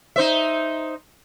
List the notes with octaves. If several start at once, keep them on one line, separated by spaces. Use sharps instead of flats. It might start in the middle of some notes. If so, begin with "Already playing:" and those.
D#4 C5 E5